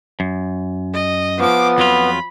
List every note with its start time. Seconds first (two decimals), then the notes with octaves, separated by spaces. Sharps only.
0.20 F#2
0.93 D#5
1.39 F3 B3 D6
1.78 F2 F#3 F4 B5